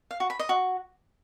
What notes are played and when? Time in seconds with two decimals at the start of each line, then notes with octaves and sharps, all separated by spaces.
0.11 F5
0.20 F#4
0.30 B5
0.39 D#5
0.49 F#4